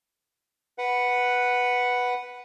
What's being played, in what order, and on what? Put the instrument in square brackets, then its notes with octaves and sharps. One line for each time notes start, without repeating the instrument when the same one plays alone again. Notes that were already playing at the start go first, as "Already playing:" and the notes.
[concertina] B4 F#5